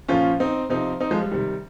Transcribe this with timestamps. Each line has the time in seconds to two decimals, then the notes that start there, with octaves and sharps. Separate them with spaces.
0.08 A#2 F3 C#4 F4
0.40 C4 D#4
0.70 C3 F3 C4 D#4
1.00 C4 D#4
1.11 F3 G#3
1.21 G3
1.31 C3 D#3 G3